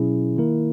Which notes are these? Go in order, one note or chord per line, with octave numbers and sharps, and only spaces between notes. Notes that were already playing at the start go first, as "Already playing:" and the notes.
Already playing: B2 F#3 C#4 E4 G#4
D#3 A#3 E4 A#4